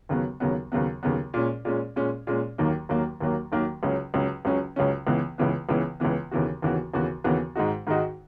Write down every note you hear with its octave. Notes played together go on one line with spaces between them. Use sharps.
D#2 C#3 F#3 B3
D#2 C#3 F#3 B3
D#2 C#3 F#3 B3
D#2 C#3 F#3 B3
A#2 G#3 C#4
A#2 G#3 C#4
A#2 G#3 C#4
A#2 G#3 C#4
D#2 D#3 F#3 A#3
D#2 D#3 F#3 A#3
D#2 D#3 F#3 A#3
D#2 D#3 F#3 A#3
C#2 C#3 F#3 C#4
C#2 C#3 F#3 C#4
C#2 C#3 F#3 C#4
C#2 C#3 F#3 C#4
C#2 C#3 E3 B3
C#2 C#3 E3 B3
C#2 C#3 E3 B3
C#2 C#3 E3 B3
D#2 C#3 E3 B3 F#4
D#2 C#3 E3 B3 F#4
D#2 C#3 E3 B3 F#4
D#2 C#3 E3 B3 F#4
G#2 D#3 G#3 D#4 F#4
G#2 D#3 G#3 D#4 F#4